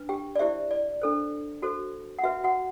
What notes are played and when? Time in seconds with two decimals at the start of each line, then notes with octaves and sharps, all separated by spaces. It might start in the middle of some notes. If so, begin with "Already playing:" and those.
Already playing: D4 B4
0.09 G4 G5
0.36 D5
0.39 E4 G4 C5 E5
0.71 D5
1.02 D4 A4 C5
1.62 F#4 A4 C5
2.19 F#5
2.23 F#4 B4 E5
2.44 F#4 F#5